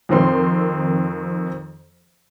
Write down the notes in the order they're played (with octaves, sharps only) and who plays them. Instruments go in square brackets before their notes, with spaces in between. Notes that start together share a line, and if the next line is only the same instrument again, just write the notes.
[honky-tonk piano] F2 D#3 C4 C6